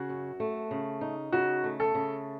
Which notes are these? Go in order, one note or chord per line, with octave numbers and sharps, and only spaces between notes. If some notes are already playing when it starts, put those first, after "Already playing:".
Already playing: C#3 F#4
F#2
A3
C#3
D#4
C#3 F#4
A3
A4
C#3